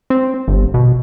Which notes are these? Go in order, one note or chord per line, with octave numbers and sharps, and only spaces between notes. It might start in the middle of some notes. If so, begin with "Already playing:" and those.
C4
G1
B2